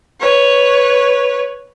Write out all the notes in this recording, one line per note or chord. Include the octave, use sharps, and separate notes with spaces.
B4 C#5